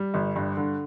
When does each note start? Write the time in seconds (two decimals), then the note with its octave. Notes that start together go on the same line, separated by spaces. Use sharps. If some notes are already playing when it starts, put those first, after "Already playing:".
Already playing: G3
0.14 G1
0.36 G2
0.57 D3